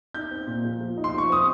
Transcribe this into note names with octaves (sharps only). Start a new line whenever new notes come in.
D#4 G6
C4
A#2
F3
F3
D#4
C6
F3 C#6
C4 D#6